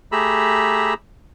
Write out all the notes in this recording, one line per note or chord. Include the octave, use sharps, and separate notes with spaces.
A3 G4 G#4 A#5 B5 E6